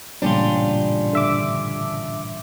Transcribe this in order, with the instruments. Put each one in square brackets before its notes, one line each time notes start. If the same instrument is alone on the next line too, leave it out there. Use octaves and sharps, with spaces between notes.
[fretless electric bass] A1 A#2 C#3 [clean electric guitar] G2 C#4 F4 [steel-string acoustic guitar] D4 G4
[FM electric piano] D3 E5 D6